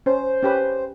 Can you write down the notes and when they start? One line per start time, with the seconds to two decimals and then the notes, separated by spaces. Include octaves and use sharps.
0.06 C#4 C5
0.43 C#4 G4 B4